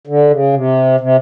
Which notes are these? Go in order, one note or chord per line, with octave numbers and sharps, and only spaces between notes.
D3
C#3
C3
C3